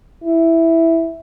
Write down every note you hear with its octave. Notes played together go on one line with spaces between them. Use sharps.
E4